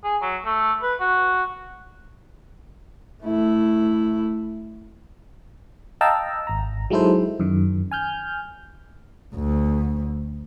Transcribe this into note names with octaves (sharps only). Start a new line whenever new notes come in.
G#4
F#3
A3
B4
F#4
A3 E4
D#5 F5 G5 A5 A#5 E6
G#1 A#5
F#3 G#3 D#4 E4 A4 C5
F#2 D#3
G#5 F6 G6
D2